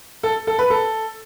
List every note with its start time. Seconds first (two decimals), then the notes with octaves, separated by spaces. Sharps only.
0.23 A4
0.47 A4
0.59 B4
0.70 A4